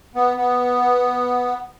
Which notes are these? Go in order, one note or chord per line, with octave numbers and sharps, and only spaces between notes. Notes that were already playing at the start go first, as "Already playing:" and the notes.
B3
B3